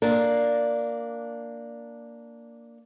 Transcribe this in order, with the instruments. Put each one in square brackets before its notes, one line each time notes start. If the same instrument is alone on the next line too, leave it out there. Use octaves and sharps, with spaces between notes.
[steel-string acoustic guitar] A#3 D4